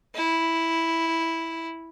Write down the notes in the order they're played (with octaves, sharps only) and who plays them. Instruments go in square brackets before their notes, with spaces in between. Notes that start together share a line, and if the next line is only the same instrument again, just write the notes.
[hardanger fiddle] E4